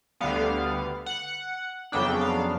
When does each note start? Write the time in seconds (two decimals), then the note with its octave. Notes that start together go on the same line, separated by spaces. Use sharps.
0.20 D2 D3 G3 B3 F5
1.06 F#5
1.92 F2 C#3 F#3 B3 D4 G5
2.21 F5